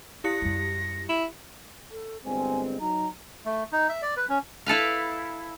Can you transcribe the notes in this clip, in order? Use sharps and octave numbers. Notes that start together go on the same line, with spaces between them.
E4 G4 A#6 C#7
F#2 G3
E4
A4
G1 G#3 C4 G#5
F#3 D#4 A#5
A3
D#4
E5
D5
B4
C#4
E4 A4 B4 F5